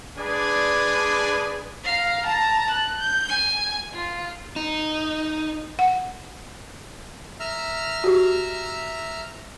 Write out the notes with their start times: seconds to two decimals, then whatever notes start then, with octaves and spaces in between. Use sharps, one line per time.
0.18 G#3 D4 G#4 B4 D5 G#5
1.84 F5 A#5
2.27 A5 A#5
2.70 F#6
3.00 G6
3.29 G#5
3.95 F4
4.56 D#4
5.79 F#5
7.40 E5 A#5 F6
8.04 F#4 G4